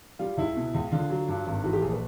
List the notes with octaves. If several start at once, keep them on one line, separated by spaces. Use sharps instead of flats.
G3 F4
C#2 E4
B2
C#2
D3 F4
F#3
G2
G#1
E3 F#4
G4
A#1 G#4
B4